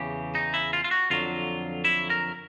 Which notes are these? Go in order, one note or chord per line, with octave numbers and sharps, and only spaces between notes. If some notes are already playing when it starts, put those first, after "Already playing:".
Already playing: E2 C#3 E3 G4
D#4
E4
F4
F4
F#4
F2 D3 F#3 F4
E4
A#4